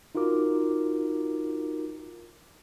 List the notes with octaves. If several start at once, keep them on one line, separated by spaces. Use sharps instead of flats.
D#4 F4 F#4 A#4 D6